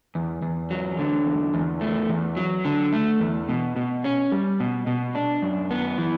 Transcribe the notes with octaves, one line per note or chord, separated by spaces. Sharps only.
E2
E2
F#3
D3
E2
E2
A3
E2
F#3
D3
A3
E2
B2
B2
C#4
G3
B2
B2
D4
F#2
B3
E3